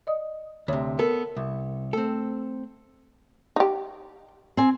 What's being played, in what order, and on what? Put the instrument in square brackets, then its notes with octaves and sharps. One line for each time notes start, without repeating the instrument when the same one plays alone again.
[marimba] D5 D#5 D#6
[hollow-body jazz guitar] D2 C3 [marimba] C#5
[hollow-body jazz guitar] B3 A4 [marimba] A#4
[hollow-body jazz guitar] C2
[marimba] A3 [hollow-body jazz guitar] C4 A4
[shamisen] D#4 G4
[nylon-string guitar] C4 G#5